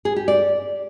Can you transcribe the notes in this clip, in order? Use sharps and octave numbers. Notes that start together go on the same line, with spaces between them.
G#4
G4
D5